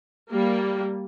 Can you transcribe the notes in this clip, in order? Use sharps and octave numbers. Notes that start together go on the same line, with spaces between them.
G3 A#3